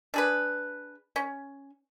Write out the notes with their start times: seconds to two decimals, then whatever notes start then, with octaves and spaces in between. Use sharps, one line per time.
0.14 D4 G#4 B4
1.16 C#4